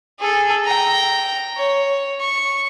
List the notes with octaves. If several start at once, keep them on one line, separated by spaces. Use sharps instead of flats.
G#4 A4
G5 A#5
C#5
C#6